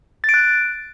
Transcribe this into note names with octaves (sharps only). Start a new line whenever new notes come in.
A6
D7
F#6